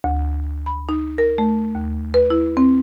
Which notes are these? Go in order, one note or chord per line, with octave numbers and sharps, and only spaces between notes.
D2
B5
D#4
A#4
A3
D#2
B4
E4
C4